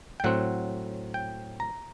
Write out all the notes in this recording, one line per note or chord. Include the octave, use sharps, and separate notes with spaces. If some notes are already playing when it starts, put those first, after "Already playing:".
G5
A2 F#3 C4 F#5
G5
A#5